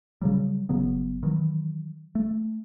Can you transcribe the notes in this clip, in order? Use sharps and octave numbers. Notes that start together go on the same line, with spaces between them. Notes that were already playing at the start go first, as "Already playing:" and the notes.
C#3 F#3 G3
G1 C#3 F#3 B3
D#3 E3 F#3
A3